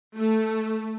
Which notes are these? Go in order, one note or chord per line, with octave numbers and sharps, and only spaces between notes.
A3